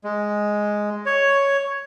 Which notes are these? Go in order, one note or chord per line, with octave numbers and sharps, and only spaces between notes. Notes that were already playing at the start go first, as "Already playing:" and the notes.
G#3
C#5